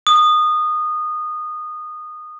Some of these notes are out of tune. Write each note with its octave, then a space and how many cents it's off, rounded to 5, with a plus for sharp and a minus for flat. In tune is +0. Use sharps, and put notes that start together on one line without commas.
D#6 -20